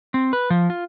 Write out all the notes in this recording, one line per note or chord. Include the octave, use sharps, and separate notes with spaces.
C4
B4
F3
F4